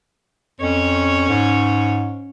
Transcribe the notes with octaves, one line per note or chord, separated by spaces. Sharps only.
F2 C#4 C#5
G#2